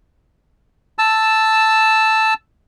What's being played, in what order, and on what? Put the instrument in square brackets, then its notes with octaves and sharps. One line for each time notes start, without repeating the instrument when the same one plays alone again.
[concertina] A5 E6